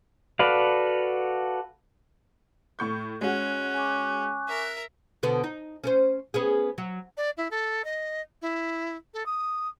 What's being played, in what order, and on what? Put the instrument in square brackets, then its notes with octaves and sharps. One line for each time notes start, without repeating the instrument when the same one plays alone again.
[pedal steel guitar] F#4 A4 B4 D5 F5
[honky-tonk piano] A2 C#6 G6
[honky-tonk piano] G#3 F#4 [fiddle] C#4 [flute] F#6
[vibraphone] G#5 C#6 D6
[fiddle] A#4 E5
[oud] B2 D3 B3
D#4
C#4 A4 C5
B3 C#4 G#4
F#3
[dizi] D5
E4
A4
D#5
E4
A4
D#6